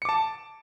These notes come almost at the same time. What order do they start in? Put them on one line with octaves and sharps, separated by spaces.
C#7 D6 A5